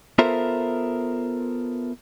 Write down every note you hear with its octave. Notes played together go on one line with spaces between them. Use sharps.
B3 F4 A4 A#4 C5 E5